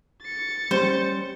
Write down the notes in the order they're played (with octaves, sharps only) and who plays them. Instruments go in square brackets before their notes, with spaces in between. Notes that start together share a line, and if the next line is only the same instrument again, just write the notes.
[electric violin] A6 C#7
[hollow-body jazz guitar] G3 C#4 [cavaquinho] C5